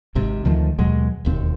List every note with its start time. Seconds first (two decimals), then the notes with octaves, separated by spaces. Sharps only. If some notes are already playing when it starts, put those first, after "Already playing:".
0.15 G#1 G#2 C3
0.45 D2 D#3 F3 A3
0.79 D#2 B2 F#3 G#3
1.25 E1 D#2 C4